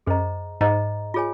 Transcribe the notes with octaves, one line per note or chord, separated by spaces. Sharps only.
F#2 G#4 C5 D#5 A#5
G#2 G#4 C5 D#5 A#5
F4 G#4 C#5 G#5